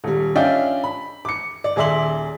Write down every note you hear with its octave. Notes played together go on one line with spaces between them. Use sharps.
D#1 G3
C#4 D4 F4 D#5 E5 G5
B5
D6 C#7
D5
D#1 G#4 D5 E5 C6 F#7